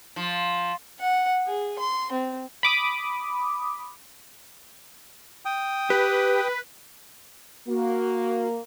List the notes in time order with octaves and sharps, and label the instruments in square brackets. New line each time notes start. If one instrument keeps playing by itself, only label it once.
[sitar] F3
[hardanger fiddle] F#5
G#4
C6
C4
[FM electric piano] B5 D6 D#6
[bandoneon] G5 D#6
[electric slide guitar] G4 [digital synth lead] B4
[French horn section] A#3 [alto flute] F#4